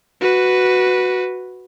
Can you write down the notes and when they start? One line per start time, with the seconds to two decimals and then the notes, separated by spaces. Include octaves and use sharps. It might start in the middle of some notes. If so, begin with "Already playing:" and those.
0.21 F#4 B4